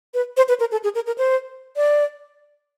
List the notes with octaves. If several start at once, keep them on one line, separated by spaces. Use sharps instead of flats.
B4
C5
B4
A#4
A4
G#4
A#4
A#4
C5
D5